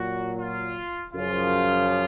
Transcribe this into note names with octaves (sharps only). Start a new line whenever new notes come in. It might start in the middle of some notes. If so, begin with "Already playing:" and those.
Already playing: A#2 F#3 F#4
F4
F#2 C#3 F3 F4